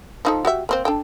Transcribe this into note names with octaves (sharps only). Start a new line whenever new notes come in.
F3 D#4 A4
F#4 G4 E5
A#3 C4 C5
D4 A4 G5